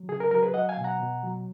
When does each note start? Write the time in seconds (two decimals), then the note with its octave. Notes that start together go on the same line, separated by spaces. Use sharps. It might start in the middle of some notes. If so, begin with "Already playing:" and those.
Already playing: F#3
0.08 C#3 G#4
0.20 A#4
0.31 F#3 A#4
0.43 G#4 B4
0.54 F#3 D#5 F#5
0.69 F5 G#5
0.77 B2
0.84 F#5 A#5
0.99 B2
1.23 F#3